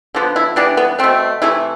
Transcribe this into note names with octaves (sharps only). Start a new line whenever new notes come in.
D3 F3 B3
E4
E3 G3 B3 D4
B3
B2 A3 C4
C3 E3 A3 E4